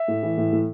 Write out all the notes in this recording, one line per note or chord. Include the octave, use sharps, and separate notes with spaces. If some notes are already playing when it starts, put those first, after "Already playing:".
Already playing: E5
A2
E3
A2
A2